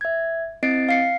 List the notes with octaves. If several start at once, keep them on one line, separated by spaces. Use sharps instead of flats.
E5 G#6
C4 E4 D#5 A6 C7 D7
F5 C7 C#7